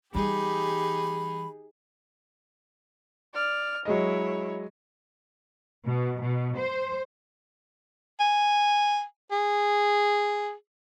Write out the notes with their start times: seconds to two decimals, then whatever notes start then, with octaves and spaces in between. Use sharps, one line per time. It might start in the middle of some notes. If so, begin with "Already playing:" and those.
0.15 E3 G3 D#4 G4 G#4 B5
3.33 D5 F6
3.85 F#3 G#3 E4 C#5 D#5
5.87 B2
6.21 B2
6.58 C5
8.19 G#5
9.31 G#4